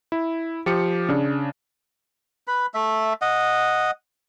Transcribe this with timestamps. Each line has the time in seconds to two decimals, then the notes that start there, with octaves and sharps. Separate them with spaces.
0.12 E4
0.66 F3 G4 C#7
1.09 C#3 D4
2.47 B4 B5
2.74 A3 E5
3.22 D#5 F#5